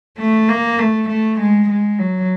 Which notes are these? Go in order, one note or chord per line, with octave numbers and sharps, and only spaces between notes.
A3
A#3
A3
A3
G#3
G#3
F#3